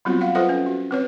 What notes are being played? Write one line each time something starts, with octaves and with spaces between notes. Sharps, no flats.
F#3 G3 B3 C4 F4 F#4
F5 F#5
F4 A4 B4 C5 E5 F#5
C#4
F#4
C4 B4 C#5